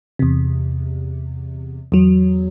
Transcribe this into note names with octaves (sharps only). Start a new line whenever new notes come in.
E2 C3
E2 F#3